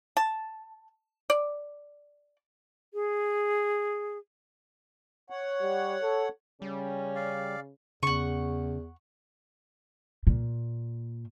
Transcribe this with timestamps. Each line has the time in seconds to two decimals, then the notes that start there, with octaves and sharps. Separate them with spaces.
0.17 A5
1.30 D5
2.94 G#4
5.30 C#5 F#5
5.62 G3
6.02 A4
6.62 C#3 G3 C#4
7.16 D5 F5
8.03 E2 C#3 F#5 C#6
10.27 A#2